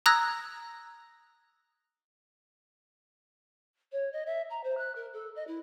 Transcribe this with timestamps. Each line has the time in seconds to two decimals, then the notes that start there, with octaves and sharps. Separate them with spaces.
0.06 A#5 D#6 E6 F#6 G#6 A#6
3.92 C#5
4.13 D#5
4.26 E5
4.50 A#5
4.64 C5
4.78 F#6
4.95 A#4
5.13 A4
5.36 D#5
5.47 E4